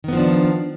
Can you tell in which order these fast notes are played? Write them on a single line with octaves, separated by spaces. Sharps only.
D#3 B3 F3 D4